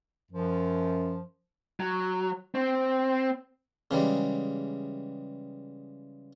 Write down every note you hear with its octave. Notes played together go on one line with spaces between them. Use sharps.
F#2 F3
F#3
C4
C#3 E3 G3 G#3